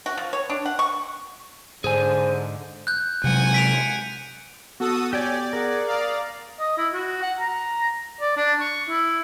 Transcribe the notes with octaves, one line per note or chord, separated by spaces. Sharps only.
F#4
F3
C#5
D4
F#5
C#6
G#2 D3 G#4 C5 G#5
F#6 G6
C3 F#3 G#3 F#5 G#5
B6 D7 F7
B3 F#4 A4 D#6 E6
G4 C#5 D5 G5 G#5
G#4 A#4 F#5
D5 F5 A#5 D#6 F6
D#5
E4
F#4
F#5
A#5
D5
D4
C#6
E4